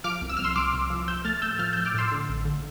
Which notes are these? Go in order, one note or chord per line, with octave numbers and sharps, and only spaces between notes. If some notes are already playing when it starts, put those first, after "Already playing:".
F3 D6 F6
C2
E6
C2 F6
C6 E6
C2 D6 F6
C2
F3
F3 E6 G6
A3 F6 A6
A2 E6 G6
F3 F6 A6
E6 G6
F3
D6 F6
A2 C6 E6
D3
A1
D3